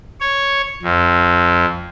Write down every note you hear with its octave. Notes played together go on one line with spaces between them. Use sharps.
C#5
F2